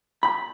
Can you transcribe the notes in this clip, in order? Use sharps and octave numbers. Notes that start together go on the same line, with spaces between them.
B5